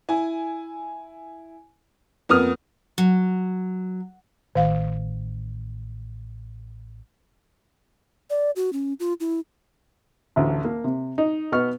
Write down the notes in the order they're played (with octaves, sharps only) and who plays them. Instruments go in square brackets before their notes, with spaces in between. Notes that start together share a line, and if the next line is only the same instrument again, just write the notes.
[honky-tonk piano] E4 G#5
F2 A#3 B3 D#6 F6
[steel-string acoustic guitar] F#3
[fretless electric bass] A1 [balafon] D#3 F5
[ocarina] D5
F#4
C#4
F4
E4
[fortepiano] A1 D2
A#3
C3
D#4
B2 B3 D#5 C#6 F6